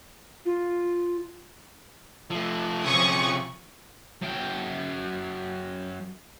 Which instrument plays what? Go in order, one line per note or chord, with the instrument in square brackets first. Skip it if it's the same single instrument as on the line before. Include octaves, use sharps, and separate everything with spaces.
[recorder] F4
[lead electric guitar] F3 A3
[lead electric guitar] C3 C#4 [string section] F3 C#6 D#6
[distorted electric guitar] F#2 G5